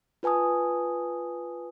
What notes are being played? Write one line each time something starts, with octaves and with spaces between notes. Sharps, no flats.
F4 B4 G#5 A5 D#6